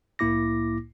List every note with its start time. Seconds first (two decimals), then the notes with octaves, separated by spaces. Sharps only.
0.19 C2 A2 A#3 E4 D6 A#6